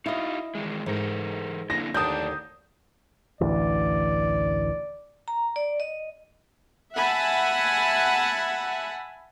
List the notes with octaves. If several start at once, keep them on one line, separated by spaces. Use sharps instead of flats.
D#4 E4 F#4 D#5 F5
D#3 E3 G#3
G#2 E3 A4 A#4
D3 A#3 E4 A#6
D#2 A2 D3 D5 A5 D#6 G6
A1 D2 E3 D5
A#5
D5
D#5
E5 F#5 G#5 A5 B5